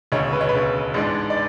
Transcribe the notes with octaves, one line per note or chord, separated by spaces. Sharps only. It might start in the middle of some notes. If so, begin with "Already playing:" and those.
E1 D2 C#3 C#5
B4
C#5
B4
E1 D2 C#3
A1 G#2 G#3 D4
D5